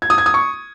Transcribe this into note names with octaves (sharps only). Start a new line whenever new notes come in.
G#6
D#6
G#6
D#6
C#6